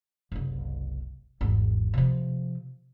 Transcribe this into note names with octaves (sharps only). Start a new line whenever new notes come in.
F#1 C2
G#1 E2
C3 F3